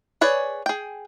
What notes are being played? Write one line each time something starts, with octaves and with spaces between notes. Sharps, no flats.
G#4 B4 C#5 D5
G#4 G5